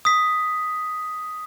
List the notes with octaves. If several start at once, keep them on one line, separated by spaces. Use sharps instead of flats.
D#6 B6